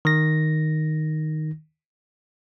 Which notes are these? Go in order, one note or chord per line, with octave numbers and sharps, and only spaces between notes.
D#3 A#6